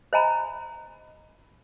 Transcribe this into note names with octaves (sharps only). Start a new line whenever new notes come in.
C5 D#5 G#5 A#5 B5